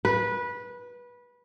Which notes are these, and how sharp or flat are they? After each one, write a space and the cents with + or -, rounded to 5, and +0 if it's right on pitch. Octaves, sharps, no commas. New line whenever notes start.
B4 -20